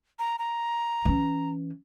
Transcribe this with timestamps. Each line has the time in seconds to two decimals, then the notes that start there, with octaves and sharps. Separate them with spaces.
0.19 A#5
0.39 A#5
1.05 E3 C#4